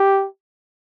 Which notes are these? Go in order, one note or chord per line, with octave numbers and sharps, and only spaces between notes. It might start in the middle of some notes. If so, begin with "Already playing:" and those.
Already playing: G4